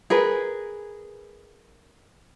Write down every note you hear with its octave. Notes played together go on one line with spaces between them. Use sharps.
G#4 A#4 B4